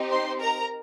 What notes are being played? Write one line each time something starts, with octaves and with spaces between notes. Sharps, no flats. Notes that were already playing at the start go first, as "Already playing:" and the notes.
Already playing: C4 D#4 G4
C5 C6
A#4 A#5